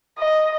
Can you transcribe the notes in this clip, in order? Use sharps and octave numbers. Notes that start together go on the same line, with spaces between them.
D#5